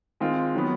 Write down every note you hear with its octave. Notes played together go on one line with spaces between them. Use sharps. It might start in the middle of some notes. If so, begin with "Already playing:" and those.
D#3 G#3 C4 F4
D#3 F#3 B3